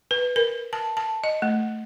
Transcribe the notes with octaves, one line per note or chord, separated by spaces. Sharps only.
B4
A#4
A5
A5
D#5
A3